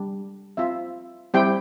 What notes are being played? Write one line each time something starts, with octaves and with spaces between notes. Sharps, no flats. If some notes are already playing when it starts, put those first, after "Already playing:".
Already playing: G3 D4
C4 F4 E5
G3 C4 E4 G4 G5